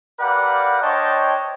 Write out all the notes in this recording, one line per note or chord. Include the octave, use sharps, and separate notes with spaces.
G4 A#4 B4 D5 F5 F#5
D4 C5 C#5 D#5 G5 A5